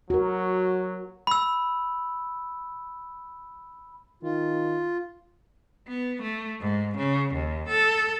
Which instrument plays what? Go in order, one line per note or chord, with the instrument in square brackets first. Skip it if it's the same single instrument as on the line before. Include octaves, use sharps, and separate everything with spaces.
[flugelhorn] F#3 [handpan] F#4 A#4
[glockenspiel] B5 E6
[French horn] D#3 [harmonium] F4
[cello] B3
A3
G#2
C#3
D#2
A4